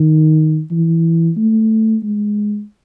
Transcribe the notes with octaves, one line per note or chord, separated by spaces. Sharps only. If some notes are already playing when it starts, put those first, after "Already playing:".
Already playing: D#3
E3
A3
G#3